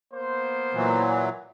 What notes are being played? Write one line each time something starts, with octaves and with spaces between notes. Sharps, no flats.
A#3 B3 C5
A#2 E3 F#3